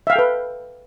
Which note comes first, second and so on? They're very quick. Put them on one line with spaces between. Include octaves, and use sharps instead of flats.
E5 F5 G5 A4 B4